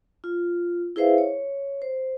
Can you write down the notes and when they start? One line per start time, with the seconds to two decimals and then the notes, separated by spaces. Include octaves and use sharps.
0.24 F4
0.96 E4 G#4 B4 C5 E5 F5
1.18 C#5
1.82 C5